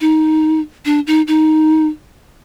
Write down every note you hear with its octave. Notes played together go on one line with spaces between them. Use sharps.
D#4
D4
D#4
D#4